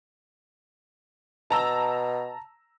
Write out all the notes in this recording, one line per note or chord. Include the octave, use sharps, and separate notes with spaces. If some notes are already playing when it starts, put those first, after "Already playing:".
B2 A5 A#5 E6